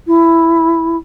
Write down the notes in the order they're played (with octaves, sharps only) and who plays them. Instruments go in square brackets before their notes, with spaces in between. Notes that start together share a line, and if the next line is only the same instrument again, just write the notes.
[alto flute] E4